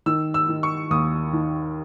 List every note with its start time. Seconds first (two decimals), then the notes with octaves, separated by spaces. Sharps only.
0.06 D#3 E6
0.34 E6
0.49 D#3
0.63 C#6
0.91 D#2 D#6
1.33 D#3